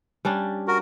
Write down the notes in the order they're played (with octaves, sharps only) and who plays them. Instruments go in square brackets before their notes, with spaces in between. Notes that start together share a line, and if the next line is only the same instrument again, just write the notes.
[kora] G3 C#4 D4
[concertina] F#4 A#4